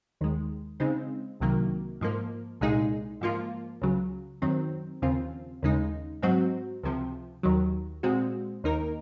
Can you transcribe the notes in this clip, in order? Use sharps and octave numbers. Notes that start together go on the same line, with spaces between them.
D#2 D#3 G#3
C#3 G#3 C4 D#4
C2 C3 D#3 F#3 A#3
G#2 F3 A#3
C2 A#2 G#3 D#4 G#4
G#2 F3 A#3 F4
C#2 C#3 F#3
F#2 D#3 F#3 C4
D#2 C#3 F3 C4 F4
D#2 C#3 G#3 D#4
G#2 F#3 C4 F#4
C#2 C3 F3
D#2 D#3 F#3
A#2 G#3 C4 F#4
D#2 D#3 A#3 D#4 A#4